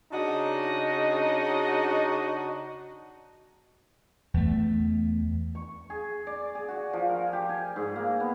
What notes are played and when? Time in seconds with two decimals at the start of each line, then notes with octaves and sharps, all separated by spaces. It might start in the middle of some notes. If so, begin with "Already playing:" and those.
0.12 C#3 D4 D#4 F#4 D#5
4.34 E2 A3
5.55 C#6
5.90 G#4
6.27 D5
6.55 G#4
6.68 F#4
6.93 F3
7.09 A#4
7.33 G4
7.49 G#5
7.76 G#2
7.96 A#3
8.20 B3